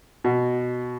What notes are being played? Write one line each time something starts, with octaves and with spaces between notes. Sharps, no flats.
B2